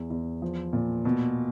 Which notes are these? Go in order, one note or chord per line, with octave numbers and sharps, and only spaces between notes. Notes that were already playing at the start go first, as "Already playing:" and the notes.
Already playing: E2
E2
F3
A#2
B2